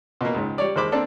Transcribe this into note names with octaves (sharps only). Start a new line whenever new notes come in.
B2 A#3
C#2 G#2
G3 C#5 D5
D#2 G#3 C5 B5 D6
A#3 C4 D4 A4 D5